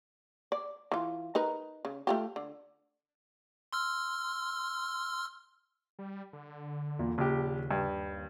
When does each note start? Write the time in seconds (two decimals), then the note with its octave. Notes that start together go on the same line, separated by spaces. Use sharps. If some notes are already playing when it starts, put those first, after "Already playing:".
0.52 D5
0.92 E3 F4
1.35 D#4 A#4 B4
1.85 C#3
2.07 A3 F4 G4
2.36 D3
3.73 C6 E6 F6
5.99 G3
6.33 D3
6.99 E2 A#2
7.18 A#1 D#2 C#3 G4
7.71 G2